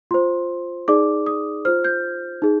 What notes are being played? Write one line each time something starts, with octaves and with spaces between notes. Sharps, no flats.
F4 C5 C6
D#4 G#4 D5 D6
D#6
F4 C5 F6
G6
D#4 G#4